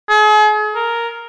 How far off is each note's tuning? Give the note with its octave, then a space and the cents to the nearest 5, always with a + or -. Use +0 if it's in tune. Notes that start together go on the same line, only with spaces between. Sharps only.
G#4 +40
A#4 +0